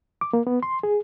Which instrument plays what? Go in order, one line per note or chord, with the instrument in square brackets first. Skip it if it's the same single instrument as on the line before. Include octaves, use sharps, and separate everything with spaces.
[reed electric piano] D6
A#3
B3
C6
G#4